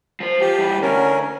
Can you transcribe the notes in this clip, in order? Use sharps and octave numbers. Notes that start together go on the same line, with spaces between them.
F3 C5
F3 G4
E3 G3
D2 C#4 A#4